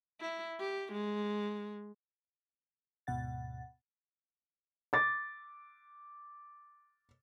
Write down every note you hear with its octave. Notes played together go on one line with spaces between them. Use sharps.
E4
G4
G#3
D2 G#2 B2 F#5 A6
D6 A6